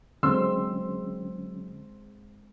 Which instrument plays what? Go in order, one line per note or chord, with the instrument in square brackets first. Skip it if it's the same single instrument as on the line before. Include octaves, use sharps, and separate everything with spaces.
[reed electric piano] D3 F#3 C#4 [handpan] G#3 C4 [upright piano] C6 E6